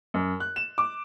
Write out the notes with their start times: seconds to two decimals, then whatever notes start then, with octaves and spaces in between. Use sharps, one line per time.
0.14 F#2
0.40 F#6
0.56 E7
0.78 D6